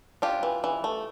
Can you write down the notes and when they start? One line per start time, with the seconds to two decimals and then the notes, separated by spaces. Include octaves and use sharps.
0.22 D4 F4 G4
0.43 E3
0.64 E3
0.84 A3